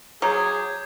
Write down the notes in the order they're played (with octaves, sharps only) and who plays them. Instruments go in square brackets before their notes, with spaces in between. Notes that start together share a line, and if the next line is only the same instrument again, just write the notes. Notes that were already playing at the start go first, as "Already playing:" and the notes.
[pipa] F#3 [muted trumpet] G#4 [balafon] A#5 [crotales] D6 G6 G#6